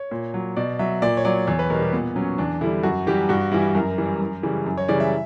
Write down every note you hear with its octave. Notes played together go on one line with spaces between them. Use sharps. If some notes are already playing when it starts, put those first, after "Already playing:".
Already playing: C#5
A#2
F#3
B2 D5
F#3 E5
A#2 D5
C#5
F#3 D5
E2 C#5
B4
B2 G3 A#4
G4
A#2 B3
F#3 C#4
E2 D4
D3 G3 E4
F#2 F#4
E3 G3 G4
G2 F#4
E3 G3 E4
F#2 A#4
E3 G3
F#2
C#3 E3 G3
F#2
C#5
C#3 E3 G3 D5
E5